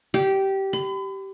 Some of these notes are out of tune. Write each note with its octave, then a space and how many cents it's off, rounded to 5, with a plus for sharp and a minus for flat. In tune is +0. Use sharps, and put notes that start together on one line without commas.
G4 -15
B5 +40